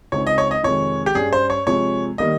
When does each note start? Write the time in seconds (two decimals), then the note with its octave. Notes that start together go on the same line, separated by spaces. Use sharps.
0.12 C#2 C#3 G#3 C4 D#4 C#5
0.27 D#5
0.38 C#5
0.51 D#5
0.63 F2 C3 D#3 G#3 C#5
1.06 G4
1.15 G2 G3 C#4 G#4
1.33 C5
1.50 C#5
1.67 C3 F3 G#3 C#5
2.18 D#3 G3 A#3 D#5